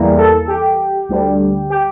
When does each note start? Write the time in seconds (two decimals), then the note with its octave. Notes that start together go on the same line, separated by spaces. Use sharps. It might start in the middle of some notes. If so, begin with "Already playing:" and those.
Already playing: E2 E3 G3 A#3
0.17 A4
0.48 G4
1.09 D2 D3 G3
1.70 G4